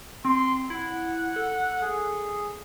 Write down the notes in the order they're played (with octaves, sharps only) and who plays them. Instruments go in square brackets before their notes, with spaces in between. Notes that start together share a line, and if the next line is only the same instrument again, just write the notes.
[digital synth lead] C4 [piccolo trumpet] C6
[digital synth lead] E4 [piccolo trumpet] F#5
[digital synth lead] A4
[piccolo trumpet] G#4